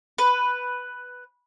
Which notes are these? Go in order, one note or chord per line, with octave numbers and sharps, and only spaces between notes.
B4